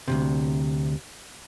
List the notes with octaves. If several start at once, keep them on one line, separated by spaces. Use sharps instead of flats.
D2 A2 C3